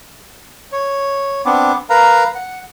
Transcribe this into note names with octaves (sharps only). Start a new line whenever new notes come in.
C#5
B3 C4 D4 D6
A#4 B4 F5 A#5
F#5